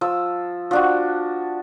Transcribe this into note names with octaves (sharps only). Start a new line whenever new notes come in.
F3 E6
F3 D4 F#4